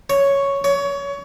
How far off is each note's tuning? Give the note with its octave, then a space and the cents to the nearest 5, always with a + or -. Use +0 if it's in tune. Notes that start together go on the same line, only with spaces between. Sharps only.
C#5 +5
C#5 +25